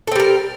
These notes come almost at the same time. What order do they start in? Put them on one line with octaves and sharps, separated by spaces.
A4 C4 G3 A#4